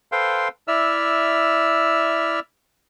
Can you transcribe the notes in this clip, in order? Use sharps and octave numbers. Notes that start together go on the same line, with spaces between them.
A4 B4 C5 F5 G5 C6
E4 D5 E5 E6 F6